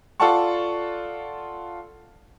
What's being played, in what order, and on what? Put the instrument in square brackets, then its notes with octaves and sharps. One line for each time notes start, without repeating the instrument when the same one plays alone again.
[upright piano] F4 A4 D5 F#5 A5 C#6